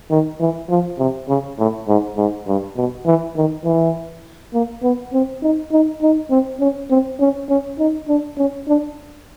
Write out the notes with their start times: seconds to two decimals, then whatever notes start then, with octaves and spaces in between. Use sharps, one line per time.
0.10 D#3
0.40 E3
0.69 F3
0.99 C3
1.28 C#3
1.58 A2
1.88 G#2
2.17 G#2
2.47 G2
2.76 B2
3.06 E3
3.36 D#3
3.65 E3
4.54 A#3
4.83 B3
5.13 C4
5.42 D#4
5.71 D#4
6.02 D#4
6.30 C4
6.60 C#4
6.90 C4
7.20 C#4
7.49 C#4
7.78 D#4
8.08 D4
8.38 C#4
8.68 D4